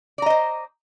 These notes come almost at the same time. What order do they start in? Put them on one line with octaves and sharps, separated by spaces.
D5 A#5 D#5 C5